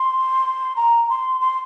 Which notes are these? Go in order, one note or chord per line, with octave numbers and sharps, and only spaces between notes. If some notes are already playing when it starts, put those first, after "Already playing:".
Already playing: C6
A#5
C6
C6